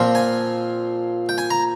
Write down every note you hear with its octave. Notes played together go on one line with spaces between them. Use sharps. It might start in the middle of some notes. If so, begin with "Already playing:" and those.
Already playing: A#2 F3 C4
G#5
G5
G#5
A#5